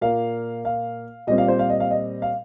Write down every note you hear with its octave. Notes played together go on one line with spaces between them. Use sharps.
A#2 A#3 F5
F5
A#2 G3 C4 D#5
F5
C5
F5
D#5
F5
D#5
F5